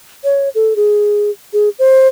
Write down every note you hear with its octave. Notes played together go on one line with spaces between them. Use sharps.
C#5
A4
G#4
G#4
C5